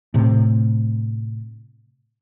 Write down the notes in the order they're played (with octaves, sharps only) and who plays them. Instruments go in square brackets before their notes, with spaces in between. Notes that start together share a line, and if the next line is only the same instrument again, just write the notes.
[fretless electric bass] A2 C3